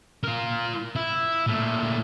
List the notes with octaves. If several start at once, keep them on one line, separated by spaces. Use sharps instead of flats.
F4 A#4
E4
A#2 A3